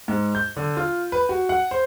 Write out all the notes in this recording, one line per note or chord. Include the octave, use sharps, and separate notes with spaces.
G#2
G6
D3
F4
B4
F#4
F#5
C5